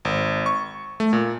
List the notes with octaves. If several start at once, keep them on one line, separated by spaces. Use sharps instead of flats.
G#1
C#6
A3
A#2